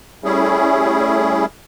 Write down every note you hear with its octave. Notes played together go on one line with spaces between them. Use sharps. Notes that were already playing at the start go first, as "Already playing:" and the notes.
G3 A3 C#4 E4 G#4